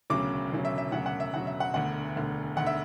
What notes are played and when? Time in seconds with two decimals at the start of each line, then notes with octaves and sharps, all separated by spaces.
0.10 E1 D2 C#3 F#3 D6
0.51 E1 D2 C#3 F#3
0.65 E5
0.78 E5
0.92 E1 D2 C#3 F#3 F#5
1.06 F#5
1.20 E5
1.33 E1 D2 C#3 F#3 F#5
1.47 E5
1.60 F#5
1.74 E1 D2 D3 F#5
2.15 E1 D2 D3
2.56 E1 D2 D3 F#5
2.66 E5